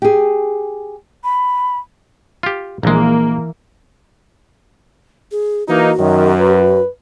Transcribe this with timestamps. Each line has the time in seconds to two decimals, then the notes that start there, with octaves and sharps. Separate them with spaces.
0.02 G4 G#4
1.24 B5
2.43 F4 G4
2.83 A#1 E3 G#3 A#3 A#4
5.32 G#4
5.68 E3 A#3 D#4 F#4
5.99 F#2 D#3
6.39 B4